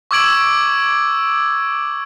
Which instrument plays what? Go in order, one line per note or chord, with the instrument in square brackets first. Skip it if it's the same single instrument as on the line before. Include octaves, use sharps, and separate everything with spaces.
[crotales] C#6 D6 E6 G#6 D7 F#7